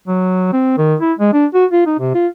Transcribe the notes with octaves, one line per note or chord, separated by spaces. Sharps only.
F#3
C4
D#3
E4
G#3
D4
F#4
F4
D#4
C3
F4